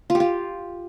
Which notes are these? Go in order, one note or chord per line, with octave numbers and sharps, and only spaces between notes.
F4
G4
F4